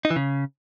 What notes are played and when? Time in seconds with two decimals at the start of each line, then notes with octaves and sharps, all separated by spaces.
0.05 D#4
0.10 E3
0.16 C#3